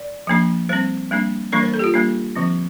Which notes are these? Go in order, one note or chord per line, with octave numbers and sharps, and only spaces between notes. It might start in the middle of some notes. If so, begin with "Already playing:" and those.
Already playing: D5
F3 A#3 D4
G3 C4 C5
G3 A#3 D4
E3 G3 A#3 D4 A#4
C5
A4
G4
F4
G3 A#3 D4
D3 F3 C4